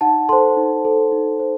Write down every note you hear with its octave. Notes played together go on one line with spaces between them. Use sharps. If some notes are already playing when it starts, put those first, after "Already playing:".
D#4 F#5 A5
A4 C5 A5 C6
D#4
A4 C5
D#4
C5